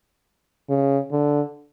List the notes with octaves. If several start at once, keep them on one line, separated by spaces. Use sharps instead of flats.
C#3
D3